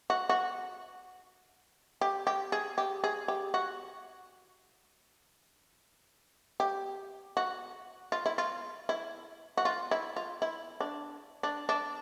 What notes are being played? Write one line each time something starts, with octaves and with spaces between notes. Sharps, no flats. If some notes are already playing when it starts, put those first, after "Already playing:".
F#4
F#4
G4
G4
G#4
G4
G#4
G4
F#4
G4
F#4
F4
E4
F4
E4
F#4
F4
E4
F4
E4
D4
D4
D4